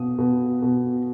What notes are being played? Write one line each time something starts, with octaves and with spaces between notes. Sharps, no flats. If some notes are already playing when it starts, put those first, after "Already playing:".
Already playing: B2 D#6
B2
B2